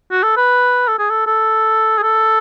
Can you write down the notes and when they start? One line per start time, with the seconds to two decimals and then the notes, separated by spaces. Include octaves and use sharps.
0.11 F#4
0.23 A4
0.37 B4
0.88 A4
0.99 G#4
1.10 A4
1.26 A4
1.98 G#4
2.03 A4